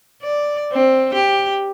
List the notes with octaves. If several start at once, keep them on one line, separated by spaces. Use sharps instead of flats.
D5
C4
G4